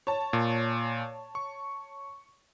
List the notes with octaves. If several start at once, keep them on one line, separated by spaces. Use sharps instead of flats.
C#5 A5
A#2
C#6